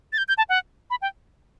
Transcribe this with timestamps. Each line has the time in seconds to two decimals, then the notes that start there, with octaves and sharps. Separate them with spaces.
0.13 A6
0.18 G6
0.28 G6
0.38 A5
0.49 F#5
0.90 B5
1.02 G5